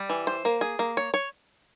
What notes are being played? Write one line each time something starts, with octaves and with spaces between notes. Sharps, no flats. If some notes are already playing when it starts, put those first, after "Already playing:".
Already playing: G3
E3
C5
A#3
G#4
A#3
C#5
C#5